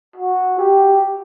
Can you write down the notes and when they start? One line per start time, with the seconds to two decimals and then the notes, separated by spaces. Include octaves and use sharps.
0.16 F#4
0.59 G4